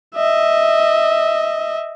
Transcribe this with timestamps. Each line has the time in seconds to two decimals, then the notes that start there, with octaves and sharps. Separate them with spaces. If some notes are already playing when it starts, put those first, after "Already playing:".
0.16 D#5 E5